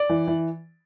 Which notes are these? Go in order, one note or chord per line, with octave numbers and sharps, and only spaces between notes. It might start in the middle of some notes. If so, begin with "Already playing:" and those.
Already playing: D5
E3
E3